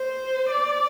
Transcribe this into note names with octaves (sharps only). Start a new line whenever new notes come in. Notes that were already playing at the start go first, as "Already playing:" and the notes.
Already playing: C5
D5